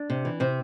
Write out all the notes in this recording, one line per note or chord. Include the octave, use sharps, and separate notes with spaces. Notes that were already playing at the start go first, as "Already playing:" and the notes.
Already playing: D4
C3
E3
C3 C4